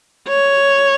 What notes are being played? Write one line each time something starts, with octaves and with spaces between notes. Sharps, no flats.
C#5